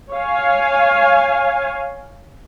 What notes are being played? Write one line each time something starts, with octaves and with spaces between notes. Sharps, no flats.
C#5 F5 G#5